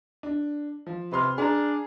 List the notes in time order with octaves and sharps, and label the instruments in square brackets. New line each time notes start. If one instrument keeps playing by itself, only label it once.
[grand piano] D4
F3
[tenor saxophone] C3 [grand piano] B4 C6 F6
[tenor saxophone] D4 [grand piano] G#4 A#5